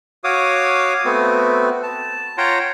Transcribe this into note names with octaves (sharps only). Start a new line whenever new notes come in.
F#4 C#5 F5 D6 D#6
A3 B3 C4 F#4
A5
F4 C#5 F#5 G5 A#5 C6